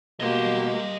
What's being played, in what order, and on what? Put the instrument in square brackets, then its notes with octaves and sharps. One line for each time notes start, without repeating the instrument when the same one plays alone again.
[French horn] B2 [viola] A#3 G4 [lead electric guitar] D#5 C6